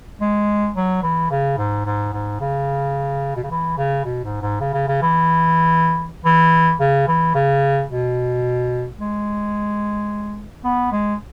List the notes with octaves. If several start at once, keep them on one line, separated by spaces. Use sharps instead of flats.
G#3
F#3
E3
C#3
G#2
G#2
G#2
C#3
B2
C#3
E3
C#3
B2
G#2
G#2
C#3
C#3
C#3
E3
E3
C#3
E3
C#3
B2
G#3
B3
G#3